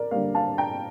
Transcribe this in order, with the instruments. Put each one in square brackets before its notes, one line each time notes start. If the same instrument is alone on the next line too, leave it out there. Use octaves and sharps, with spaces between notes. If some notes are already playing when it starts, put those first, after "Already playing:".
Already playing: [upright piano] A#4 D5
D3 G3 A#3 D5 F5
F5 A5
G5 A#5